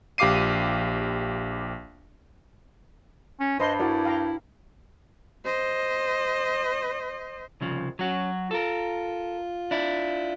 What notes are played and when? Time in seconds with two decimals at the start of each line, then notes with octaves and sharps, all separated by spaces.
0.18 A#1 G4 F5 D6 C7 D#7
3.40 C#4
3.60 G2 B4 C5 D#5 C6
3.79 E4 F#4 A#4 D5
4.05 F5 G5 A#5
5.45 C5 D#5
7.61 C2 C#3 F3
7.99 F#3 C#4 F#4
8.51 F4 A4 A#4
9.71 D4 E4